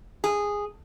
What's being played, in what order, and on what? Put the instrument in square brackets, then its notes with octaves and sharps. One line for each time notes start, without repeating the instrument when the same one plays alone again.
[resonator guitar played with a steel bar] G#4